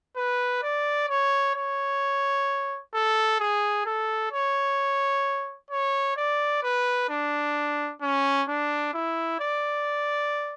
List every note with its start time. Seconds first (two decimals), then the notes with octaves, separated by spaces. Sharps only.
0.16 B4
0.63 D5
1.09 C#5
1.55 C#5
2.94 A4
3.40 G#4
3.86 A4
4.32 C#5
5.71 C#5
6.17 D5
6.63 B4
7.09 D4
8.02 C#4
8.48 D4
8.94 E4
9.40 D5